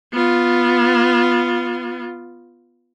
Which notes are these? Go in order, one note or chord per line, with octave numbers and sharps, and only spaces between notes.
B3 F4